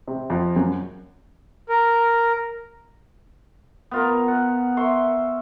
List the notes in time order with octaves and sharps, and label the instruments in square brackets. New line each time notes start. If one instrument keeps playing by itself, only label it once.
[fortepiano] C3
F2
F#2
[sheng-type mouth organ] A#4
[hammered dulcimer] B3 F4 A#4
F#5
E5 C6 C#6